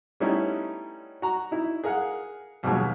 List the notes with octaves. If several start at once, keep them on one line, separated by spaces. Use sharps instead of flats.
G3 A3 B3 C#4 D#4 E4
F#4 A#5
D#4 E4
G#4 A#4 F5 F#5
D#2 B2 F3 F#3 G#3